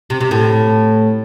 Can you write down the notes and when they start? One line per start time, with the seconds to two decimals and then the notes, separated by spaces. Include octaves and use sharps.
0.10 C3
0.20 C3
0.31 A2